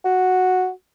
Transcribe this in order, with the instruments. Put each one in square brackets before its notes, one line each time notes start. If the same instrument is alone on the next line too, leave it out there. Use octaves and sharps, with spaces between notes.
[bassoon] F#4